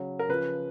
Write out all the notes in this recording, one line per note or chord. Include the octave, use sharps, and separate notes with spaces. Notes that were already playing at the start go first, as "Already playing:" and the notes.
Already playing: C#3 F#3
A#4
C#3 F3 B4